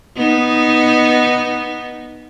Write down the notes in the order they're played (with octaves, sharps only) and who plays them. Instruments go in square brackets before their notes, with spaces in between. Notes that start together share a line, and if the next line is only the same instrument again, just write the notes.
[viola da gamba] B3 D#4